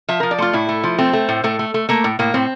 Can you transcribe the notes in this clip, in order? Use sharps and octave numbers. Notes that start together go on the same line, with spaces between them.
F3 E5
F3 A#4
D5
A3 F4
A2 E4
A3
F3
A3 C4
A3
A2
A2 A3
A3
A3
A3 A#3
A2
A2 A#3
A2 C4